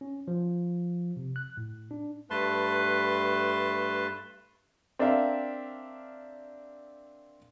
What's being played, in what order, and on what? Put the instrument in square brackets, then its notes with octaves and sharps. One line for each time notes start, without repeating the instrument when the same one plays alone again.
[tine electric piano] C#4
F3
C3
F#6
A2
D4
[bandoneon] G2 A3 B4 A5 C6
[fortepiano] C4 D4 A#4 E5 F5